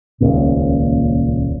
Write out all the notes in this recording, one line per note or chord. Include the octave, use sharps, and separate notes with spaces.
D#1 C#2 A#2